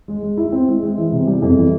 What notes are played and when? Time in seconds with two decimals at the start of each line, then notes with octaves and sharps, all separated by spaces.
0.08 G#3
0.23 G#3
0.38 E4
0.52 C4
0.68 G#3
0.83 G#3
0.98 E3
1.12 C3
1.27 G3
1.42 F2
1.58 E3